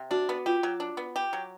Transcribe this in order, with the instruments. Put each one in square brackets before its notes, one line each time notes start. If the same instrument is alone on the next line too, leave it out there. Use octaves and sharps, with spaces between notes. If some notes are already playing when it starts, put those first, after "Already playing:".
Already playing: [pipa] C3
[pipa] D4 [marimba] F#4
[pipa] B3
[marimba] F4 [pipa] G4
[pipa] F#3
D4
B3
G4
F#3